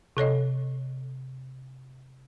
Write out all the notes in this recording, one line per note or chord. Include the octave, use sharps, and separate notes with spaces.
C3 A4 C#5 D#5